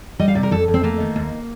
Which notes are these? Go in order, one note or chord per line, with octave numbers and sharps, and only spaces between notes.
G3 D#5
F5
C3 D5
A#4
F2 A4
F2
C4
A3 A#3
D#3
D#2